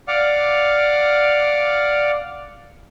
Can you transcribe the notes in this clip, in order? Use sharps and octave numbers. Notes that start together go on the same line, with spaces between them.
D5 F5 F#5 D6 F6